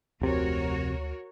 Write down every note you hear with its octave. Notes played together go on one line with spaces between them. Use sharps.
F1 D2 C3 F#4 A#4 C#5